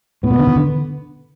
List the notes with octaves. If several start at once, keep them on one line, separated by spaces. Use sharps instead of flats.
A2 B3
A#2
D3
D#3
D3